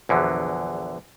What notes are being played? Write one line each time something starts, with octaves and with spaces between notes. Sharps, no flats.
A#1 E2 D3 F#3